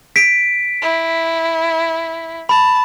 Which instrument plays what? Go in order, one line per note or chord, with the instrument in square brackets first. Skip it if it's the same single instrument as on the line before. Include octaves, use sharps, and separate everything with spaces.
[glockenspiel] B6 D7
[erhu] E4
[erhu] A5 [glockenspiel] B5